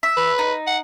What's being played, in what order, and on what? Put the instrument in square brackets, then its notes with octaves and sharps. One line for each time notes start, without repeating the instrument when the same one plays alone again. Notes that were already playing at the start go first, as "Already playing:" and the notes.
[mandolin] E5
[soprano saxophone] B4
[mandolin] D#4
[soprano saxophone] F#5